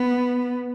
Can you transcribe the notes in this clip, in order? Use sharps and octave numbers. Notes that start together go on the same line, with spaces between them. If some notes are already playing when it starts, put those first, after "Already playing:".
Already playing: B3